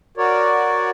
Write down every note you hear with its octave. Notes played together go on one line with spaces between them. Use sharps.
F#4 A#4 C#5 D5